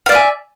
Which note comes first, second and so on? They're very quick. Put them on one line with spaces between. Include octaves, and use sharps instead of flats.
F5 D5 E5 G#5